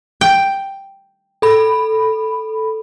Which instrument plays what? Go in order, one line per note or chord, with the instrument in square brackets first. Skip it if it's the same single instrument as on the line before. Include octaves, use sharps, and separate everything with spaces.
[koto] G5
[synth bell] A4 B5